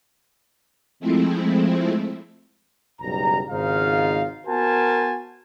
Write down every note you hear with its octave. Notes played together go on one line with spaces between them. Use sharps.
F3 G#3 A3 C4 E4
F#1 B1 G3 A#5
G#1 G#2 C#3 D#4 F4 F5
B3 F#4 A#4 C5 G#5 A5